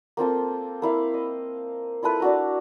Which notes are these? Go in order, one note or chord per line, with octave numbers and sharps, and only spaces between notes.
A#3 C4 F4 A4
A#3 E4 F5
D#5
E4 F4 A4 B4
D4 F#4 A#5